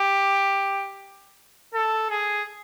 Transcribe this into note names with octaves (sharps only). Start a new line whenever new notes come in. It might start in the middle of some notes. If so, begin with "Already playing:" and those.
Already playing: G4
A4
G#4